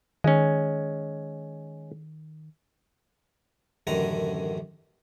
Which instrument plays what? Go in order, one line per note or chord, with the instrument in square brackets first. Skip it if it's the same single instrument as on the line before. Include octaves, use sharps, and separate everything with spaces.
[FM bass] D#3 [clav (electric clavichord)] G#3 C#4
[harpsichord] A1 F#2 D3 D#3 F#5 A#5